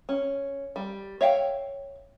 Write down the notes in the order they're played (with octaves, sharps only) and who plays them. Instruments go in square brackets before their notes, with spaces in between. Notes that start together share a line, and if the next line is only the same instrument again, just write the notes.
[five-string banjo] C#4
G3
C#5 E5 F5 G5